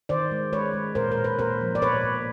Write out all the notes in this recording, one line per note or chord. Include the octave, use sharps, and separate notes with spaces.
D#3 C5 D5
G#3
G#3 B4 C#5
G#3
A#2 A#4 C5
A#4
A#2
B4
A#2 A#4 C5
F3
D5
A#2 B4 C#5
A#2